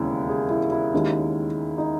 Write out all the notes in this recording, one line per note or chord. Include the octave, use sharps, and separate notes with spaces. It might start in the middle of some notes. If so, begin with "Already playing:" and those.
Already playing: E1 D#2 C#3 E4
G#4
E4
E4
D#2 D#3 G#3 C#4
D#4